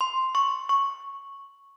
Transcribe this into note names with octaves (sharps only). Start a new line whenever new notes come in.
C6
C#6
C#6